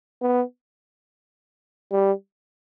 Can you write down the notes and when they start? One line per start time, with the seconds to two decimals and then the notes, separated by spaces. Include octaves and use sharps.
0.22 B3
1.92 G3